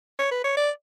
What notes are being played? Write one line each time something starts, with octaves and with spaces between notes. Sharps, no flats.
C#5
B4
C#5
D5